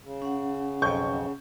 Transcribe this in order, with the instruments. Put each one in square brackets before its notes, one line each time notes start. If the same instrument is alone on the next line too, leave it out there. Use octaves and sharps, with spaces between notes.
[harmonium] C#3
[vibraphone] C#4 F#5
[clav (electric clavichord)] B1 F2 [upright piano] C#6 G6